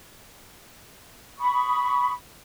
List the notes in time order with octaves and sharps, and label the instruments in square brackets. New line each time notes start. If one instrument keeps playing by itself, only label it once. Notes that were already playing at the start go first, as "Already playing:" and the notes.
[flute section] B5 C#6 D#6